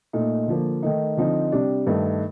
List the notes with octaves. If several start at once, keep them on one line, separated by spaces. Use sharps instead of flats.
A#2 A3 D#4
D3 F3 A#3
D#3 A3 D#4
D3 F3 C4 D#4
C3 G3 D4
G2 D#3 A3 D#4